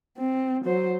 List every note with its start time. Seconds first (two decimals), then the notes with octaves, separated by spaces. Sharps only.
0.18 C4
0.65 F#3 C5